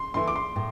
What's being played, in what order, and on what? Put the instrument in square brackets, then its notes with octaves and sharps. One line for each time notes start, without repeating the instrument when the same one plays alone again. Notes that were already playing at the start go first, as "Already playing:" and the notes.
Already playing: [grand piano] C6
[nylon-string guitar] E3 A3 E4 [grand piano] C6
[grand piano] D6
C6
[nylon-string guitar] A2